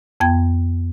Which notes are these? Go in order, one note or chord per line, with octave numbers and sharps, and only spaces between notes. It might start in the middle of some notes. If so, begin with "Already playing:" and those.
F2 B3 G5 G#6